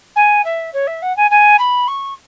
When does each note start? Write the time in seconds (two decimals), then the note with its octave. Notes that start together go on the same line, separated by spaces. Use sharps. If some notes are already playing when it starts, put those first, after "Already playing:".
0.16 G#5
0.44 E5
0.73 C#5
0.87 E5
1.02 F#5
1.17 G#5
1.30 G#5
1.59 B5
1.88 C#6